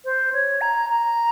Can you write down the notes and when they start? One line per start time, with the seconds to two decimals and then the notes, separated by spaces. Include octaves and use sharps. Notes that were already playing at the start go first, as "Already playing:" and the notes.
0.05 C5
0.33 C#5
0.61 A#5
0.90 A#5